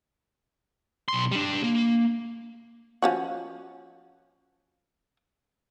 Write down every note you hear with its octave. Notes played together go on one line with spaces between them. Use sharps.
B1 C6
G3 D4
A#3
F3 C#4 F#4